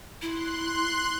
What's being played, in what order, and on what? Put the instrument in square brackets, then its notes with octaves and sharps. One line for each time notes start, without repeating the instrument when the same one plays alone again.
[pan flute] E4 [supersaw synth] C6 F#6